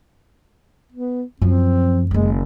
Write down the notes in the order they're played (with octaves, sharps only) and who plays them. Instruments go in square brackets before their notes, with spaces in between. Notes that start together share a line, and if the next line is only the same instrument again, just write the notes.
[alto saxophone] B3
[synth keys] F#2 [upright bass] F3 [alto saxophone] C4
[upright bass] F#1 D#3 [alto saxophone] G#3